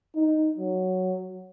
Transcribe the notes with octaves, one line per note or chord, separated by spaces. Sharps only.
D#4
F#3